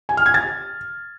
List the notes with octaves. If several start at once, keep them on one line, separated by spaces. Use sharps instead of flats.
G#5
F6
G#6
A6